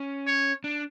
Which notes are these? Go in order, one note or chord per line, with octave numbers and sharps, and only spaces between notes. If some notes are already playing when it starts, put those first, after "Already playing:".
Already playing: C#4
C#5
D4